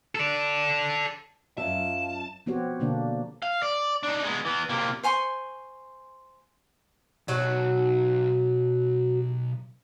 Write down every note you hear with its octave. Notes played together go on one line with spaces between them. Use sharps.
A4 D5
F#2 F4 D#5 E5 A5
F3 B3 C4 F#4 G4 C#5
B2 D3 A#3 D4 D5
F5
D5
D4 D#4
G#3 B3
E3 B3
C3 A#3
C5 G#5 C6 C#6
B1 F#3 F#4